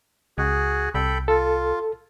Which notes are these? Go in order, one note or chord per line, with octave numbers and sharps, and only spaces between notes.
C#2 F#4 G#4
C2 A4 G5 B5
F4 A4